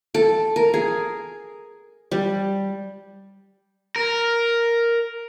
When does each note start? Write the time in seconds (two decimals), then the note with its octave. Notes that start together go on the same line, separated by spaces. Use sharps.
0.14 A4
0.56 A#4
0.74 G#4
2.11 G3
3.96 A#4